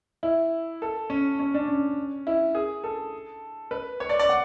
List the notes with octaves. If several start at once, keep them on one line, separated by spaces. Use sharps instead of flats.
E4
A4
C#4
C#4
D4
C#4
E4
G#4
A4
B4
C#5
D5
D5
F#5